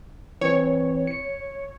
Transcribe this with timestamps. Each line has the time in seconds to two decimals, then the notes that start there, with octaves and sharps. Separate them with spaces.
0.41 E3 C4 C#5
1.07 C#7